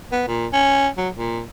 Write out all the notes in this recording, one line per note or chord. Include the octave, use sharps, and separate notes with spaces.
B3
A#2
C#4
F#3
A#2